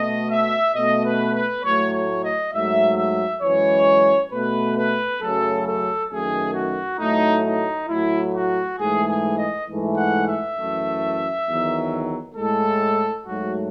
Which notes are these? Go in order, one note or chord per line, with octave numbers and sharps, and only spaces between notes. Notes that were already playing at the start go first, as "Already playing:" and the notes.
Already playing: B2 A3 D#5
E5
B2 A3 D#5
B4
B4
A2 F#3 A3 C#5
C#5
D#5
G#2 F#3 A3 E5
E5
F#2 E3 G#3 C#5
B2 A3 B4
B4
F#2 C#3 F#3 A3 A4
A4
F#2 D#3 A3 G#4
F#4
A2 F#3 A3 D#4
D#4
A2 F#3 A3 E4
F#4
G#2 E3 A3 G#4
G#4
D#5
G#2 E3 A3
F#5
E5
F#2 E3 A3
E2 D#3 F#3
A2 G#3 A4
G#2 F#3 A3 F#4